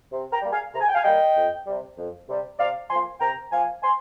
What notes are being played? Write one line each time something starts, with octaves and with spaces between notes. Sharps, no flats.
C3
G5 A#5
G3 A#3
F5 G#5
C3 A#5
G#5
G5
F5 G#5
G3 A#3 D#5 G5
F2
C3 G3
F2
C3 G3
C3 D5 F5
F3 A#3 G#5 C6
C3 G5 A#5
F3 A#3 F5 G#5
G#5 C6